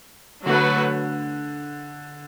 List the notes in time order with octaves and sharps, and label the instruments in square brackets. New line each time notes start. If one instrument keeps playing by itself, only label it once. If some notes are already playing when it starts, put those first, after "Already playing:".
[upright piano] D3 [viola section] F#3 A3 F#4 B4